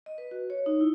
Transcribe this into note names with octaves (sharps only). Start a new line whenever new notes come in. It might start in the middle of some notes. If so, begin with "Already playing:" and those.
D#5
B4
F#4
C#5
D#4
E4